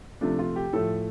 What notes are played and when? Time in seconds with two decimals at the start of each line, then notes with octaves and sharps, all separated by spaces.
0.21 C3 F3 A3 D4
0.39 F4
0.56 G4
0.73 A2 F3 A3 A4